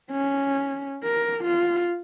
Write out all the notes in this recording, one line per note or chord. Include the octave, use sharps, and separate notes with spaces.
C#4
A#4
F4